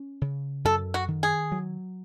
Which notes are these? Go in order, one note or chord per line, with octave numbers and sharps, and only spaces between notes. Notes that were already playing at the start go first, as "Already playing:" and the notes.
Already playing: C#4
C#3
F#2 A4
F#4
D#3
G#4
F#3